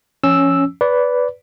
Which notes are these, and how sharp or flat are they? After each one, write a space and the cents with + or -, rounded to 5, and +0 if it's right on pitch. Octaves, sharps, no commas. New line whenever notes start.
F3 -20 C#4 +0 E6 +0
B4 +0 D5 -20